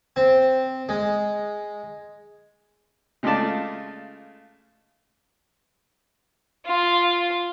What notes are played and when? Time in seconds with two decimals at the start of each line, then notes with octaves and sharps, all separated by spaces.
0.16 C4
0.89 G#3
3.23 C#3 G#3 A3 F4 D5 A5
6.66 F4